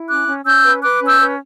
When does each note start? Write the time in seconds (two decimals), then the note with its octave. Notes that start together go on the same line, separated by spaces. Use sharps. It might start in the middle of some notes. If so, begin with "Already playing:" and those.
Already playing: E4
0.08 C#4 D6 F#6
0.28 C#4
0.46 C#4 E6 G6
0.64 B4
0.83 B4 D6 F#6
1.01 C#4
1.07 E6 G6
1.20 B4